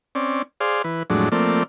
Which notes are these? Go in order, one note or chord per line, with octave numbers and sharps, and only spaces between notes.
C4 C#4 D5
G#4 C5 D5 F5
E3 B4
F2 A2 F#3 G#3 D4
F3 A3 A#3 C4 D5